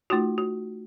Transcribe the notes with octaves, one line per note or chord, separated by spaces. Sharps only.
A3 D#4 F4 F#4
F#4